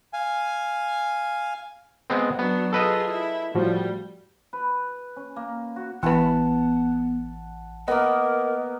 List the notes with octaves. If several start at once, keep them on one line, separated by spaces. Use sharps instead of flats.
F5 G#5
G#3 B3 C4
F#3 B3 D4
F4 G#4 A4 B4 D#5
E4
A2 F3 G3 F#4
B4
C#4
A#3
F#4
A1 E3 B3 B4 F#5 A5
A#3 B3 A#4 D#5